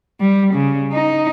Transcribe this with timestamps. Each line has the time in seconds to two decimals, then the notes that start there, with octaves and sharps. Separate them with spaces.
0.21 G3
0.54 C#3
0.93 D#4